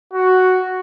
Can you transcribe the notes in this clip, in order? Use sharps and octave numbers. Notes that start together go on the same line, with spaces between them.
F#4